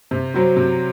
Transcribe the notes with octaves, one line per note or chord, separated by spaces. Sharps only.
C3
F#3 C4
C3